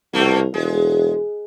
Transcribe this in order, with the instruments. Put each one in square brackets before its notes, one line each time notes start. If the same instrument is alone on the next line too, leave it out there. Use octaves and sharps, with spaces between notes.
[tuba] C2 [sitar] B2 A3 A#3
[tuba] E1 [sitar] G#3